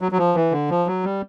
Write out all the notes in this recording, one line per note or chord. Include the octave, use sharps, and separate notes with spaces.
F#3
F#3
F3
E3
D3
F3
F#3
G3